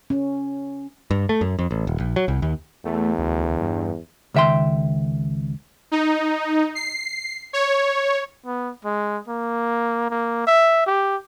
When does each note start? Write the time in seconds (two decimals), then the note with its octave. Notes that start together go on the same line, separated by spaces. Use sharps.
0.10 C#4
1.11 G2
1.29 A3
1.41 F#2
1.59 F2
1.71 A1
1.87 D#1
2.00 A#1
2.16 F#3
2.28 C2
2.42 D#2
2.85 E2 A3
3.19 D2
3.61 G2
4.34 C#2 D#3 E5 G5 C6
5.92 D#4
6.75 C7
7.53 C#5
8.46 B3
8.85 G#3
9.28 A#3
10.11 A#3
10.47 E5
10.87 G4